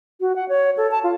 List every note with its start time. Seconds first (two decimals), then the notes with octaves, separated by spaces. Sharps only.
0.21 F#4
0.36 F#5
0.49 C#5
0.77 A4
0.91 A5
1.03 F4